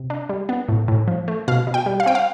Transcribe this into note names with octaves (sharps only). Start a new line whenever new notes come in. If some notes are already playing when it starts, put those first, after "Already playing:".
Already playing: C3
D4
G3
B3
A2
A2
F3
A3
B2 F5
B2
G5
G3
F5
C4 G5
F5